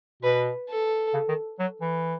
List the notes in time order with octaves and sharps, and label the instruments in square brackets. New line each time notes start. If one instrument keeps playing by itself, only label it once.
[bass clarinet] B2 [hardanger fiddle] B4
[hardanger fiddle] A4
[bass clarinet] C#3
D#3
F#3
E3